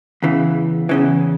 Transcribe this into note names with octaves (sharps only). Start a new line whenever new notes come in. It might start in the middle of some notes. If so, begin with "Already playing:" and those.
E2 C#3 E3
E2 C#3 E3